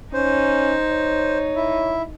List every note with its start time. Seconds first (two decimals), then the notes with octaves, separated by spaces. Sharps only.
0.14 C#4 D#4 C5
0.90 C#5
1.56 E4